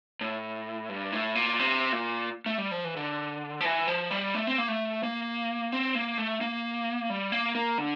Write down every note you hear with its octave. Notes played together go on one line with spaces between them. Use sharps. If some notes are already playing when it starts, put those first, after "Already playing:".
A2
G2
A2
A#2
C3
A#2
A3
G3
F3
E3
D3
F3
E3
F3
G3
A3
C4
A#3
A3
A#3
C4
A#3
A3
A#3
G3
A#3
A#3
D3